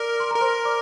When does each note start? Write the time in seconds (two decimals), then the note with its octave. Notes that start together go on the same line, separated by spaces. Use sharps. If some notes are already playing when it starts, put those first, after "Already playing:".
Already playing: A#4 D5 D6
0.20 C6
0.31 A#4 A#5
0.41 C5 C6
0.65 D5 D6